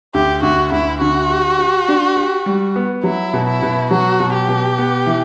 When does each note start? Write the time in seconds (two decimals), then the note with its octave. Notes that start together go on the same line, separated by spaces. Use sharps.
0.14 D2 G4
0.43 D2 F#4
0.72 D2 E4
1.01 D3 F#4
1.30 G4
1.59 G4
1.88 D4
2.17 G4
2.46 G3
2.76 B3
3.04 F#3 E4
3.34 B2
3.48 E4
3.62 B2
3.91 F#3 F#4
4.20 B2
4.34 G4
4.48 B2
4.78 B3
5.06 E3